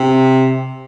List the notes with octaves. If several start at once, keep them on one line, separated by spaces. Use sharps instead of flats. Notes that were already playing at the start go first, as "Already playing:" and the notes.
Already playing: C3